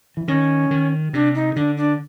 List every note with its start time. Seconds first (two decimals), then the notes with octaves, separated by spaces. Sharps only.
0.17 E3
0.28 D#3 C#4
0.71 D#3
1.13 C3 D4
1.35 D#4
1.56 D3 D4
1.77 D4